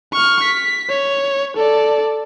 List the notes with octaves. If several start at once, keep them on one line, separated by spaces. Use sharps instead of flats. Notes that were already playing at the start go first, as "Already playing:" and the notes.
C#6 F6
B6
C#5
A4 D5